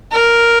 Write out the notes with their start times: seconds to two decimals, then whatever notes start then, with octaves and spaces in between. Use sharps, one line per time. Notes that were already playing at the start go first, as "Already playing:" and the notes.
0.13 A#4